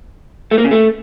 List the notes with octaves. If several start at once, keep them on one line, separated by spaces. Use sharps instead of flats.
A3
A#3
C#3
A3